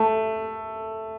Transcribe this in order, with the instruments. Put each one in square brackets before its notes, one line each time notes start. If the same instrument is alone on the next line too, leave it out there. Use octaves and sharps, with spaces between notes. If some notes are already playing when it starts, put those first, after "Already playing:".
Already playing: [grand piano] A3